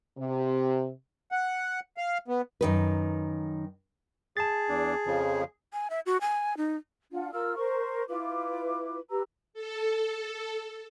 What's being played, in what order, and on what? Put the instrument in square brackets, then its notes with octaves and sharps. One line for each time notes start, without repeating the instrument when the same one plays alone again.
[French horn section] C3
[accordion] F#5
F5
B3
[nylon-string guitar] F#2 D#3 B4
[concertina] G#4 [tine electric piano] A5 A6
[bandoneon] E2 D4
F2 C#3 F3
[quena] G#5
E5
F#4
G#5
D#4
[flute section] D4 F4 F#5
F4 A#4 E6 F6
A#4 C5 C#6
E4 F4 B4 D6
G4 B4 A#5 E6
[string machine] A4